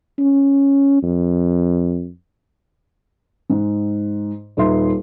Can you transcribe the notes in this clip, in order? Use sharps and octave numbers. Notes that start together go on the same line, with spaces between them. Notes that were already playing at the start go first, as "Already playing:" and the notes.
C#4
F2
G#2
D#1 D#4 B4 E5 C6